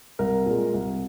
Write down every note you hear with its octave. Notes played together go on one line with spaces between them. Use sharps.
C2 A#4
A#2 G#3
C2